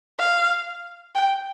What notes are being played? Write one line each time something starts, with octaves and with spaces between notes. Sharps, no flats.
F5
G5